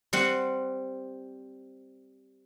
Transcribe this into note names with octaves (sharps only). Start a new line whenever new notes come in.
G3 C4 F#5